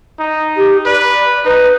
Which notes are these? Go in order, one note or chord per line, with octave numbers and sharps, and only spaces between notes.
D#4
G4
B4 D5
D#4 B4